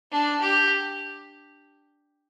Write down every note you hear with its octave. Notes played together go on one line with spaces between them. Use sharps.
D4
G4